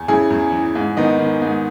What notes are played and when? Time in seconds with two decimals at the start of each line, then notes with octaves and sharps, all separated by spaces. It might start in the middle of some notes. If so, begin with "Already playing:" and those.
Already playing: E2
0.08 C#3 E4 G#4
0.31 E2
0.52 E3
0.75 G#2
0.97 D#3 B3 D#4
1.19 D#3
1.42 G#2